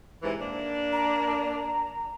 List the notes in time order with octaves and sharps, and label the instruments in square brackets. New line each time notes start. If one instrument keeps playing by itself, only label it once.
[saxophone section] G#2 C3 E3
A#3 D4
[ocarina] A#5